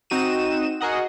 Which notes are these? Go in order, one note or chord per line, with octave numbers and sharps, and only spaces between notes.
C4 D#4 F#4 D#7 E7
F#4 G#4 A#4 D#5 F#5